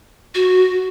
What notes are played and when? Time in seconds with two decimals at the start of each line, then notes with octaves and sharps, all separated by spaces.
0.35 F#4